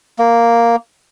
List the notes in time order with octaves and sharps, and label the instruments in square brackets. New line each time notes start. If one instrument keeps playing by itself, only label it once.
[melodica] A#3